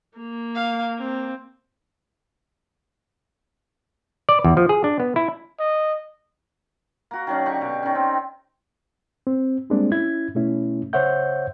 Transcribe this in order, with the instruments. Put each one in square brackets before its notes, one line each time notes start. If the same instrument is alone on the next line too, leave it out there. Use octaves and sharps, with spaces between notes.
[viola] A#3
[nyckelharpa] F5
C4
[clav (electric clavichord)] D5
E2
F3
G#4
D4
B3
E4
[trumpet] D#5
[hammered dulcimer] A#3 F#4
D#3 F#3 C#4 D4
D3 G4 C#6
B2
D#3 C#4
C4
[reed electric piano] C4
G3 G#3 A#3 C4 D4
C#4 E4 G#6
B2 A3 C#4 E4
C#3 C5 C#5 E5 F#5 G6